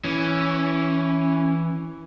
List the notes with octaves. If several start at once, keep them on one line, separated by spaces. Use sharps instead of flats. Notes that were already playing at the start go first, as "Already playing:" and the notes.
E3 C#4